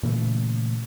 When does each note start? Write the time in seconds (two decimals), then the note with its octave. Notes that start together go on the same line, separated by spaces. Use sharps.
0.03 A#2 C#3 E3 A3